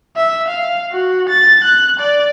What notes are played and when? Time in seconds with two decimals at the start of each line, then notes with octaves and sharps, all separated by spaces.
0.16 E5
0.48 F5
0.92 F#4
1.29 A6
1.64 F#6
1.99 D5